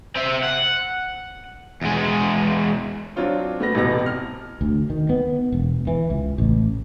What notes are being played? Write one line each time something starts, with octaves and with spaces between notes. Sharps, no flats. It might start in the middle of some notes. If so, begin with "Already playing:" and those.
C4 E5
F#5
E2 G#3
F#3 C4 D4 F4 C#5
A3 B3 A#6
E1 A1 C3 E3 B3 A#6
F6
D2
D#3
B3
E1
E3
C#2
A1